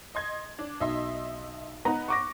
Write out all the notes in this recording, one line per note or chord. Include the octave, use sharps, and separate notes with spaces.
D#5 C6 G#6
D4
B1 D#5 E5 C6
B3 D#4 B4 A#5
C#6 D6 A#6